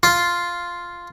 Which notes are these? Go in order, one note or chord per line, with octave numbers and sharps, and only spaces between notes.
F4